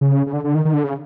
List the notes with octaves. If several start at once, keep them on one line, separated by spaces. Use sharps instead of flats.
C#3
C#3
D3
D3
D#3
D#3
D3
C#3